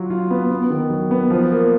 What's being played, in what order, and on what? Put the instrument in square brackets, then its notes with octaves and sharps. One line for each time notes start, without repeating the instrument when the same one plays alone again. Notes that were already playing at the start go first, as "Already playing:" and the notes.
Already playing: [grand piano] F#3 F4
F4
B3
B3
D#3
F#3
B3
F3
A#3